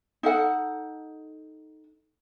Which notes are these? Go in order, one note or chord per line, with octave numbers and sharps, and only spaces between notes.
D#4 A4 F#5